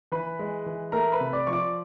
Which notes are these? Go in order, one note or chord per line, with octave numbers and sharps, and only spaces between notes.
E3 B4 B5
G#3
E3
A3 A#4 A#5
B4 B5
C3
D5 D6
F3 C#6
D5 D6